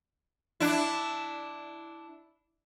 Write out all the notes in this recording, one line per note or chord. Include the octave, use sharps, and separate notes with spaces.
D4 E4